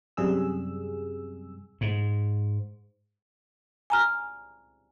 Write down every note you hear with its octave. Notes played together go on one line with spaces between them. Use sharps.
F#2 C3 G3 G#4 E6
G#2
G#5 A#5 F6